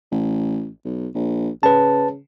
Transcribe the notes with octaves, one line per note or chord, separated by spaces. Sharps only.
A1
B1
A#1
C#3 B4 A5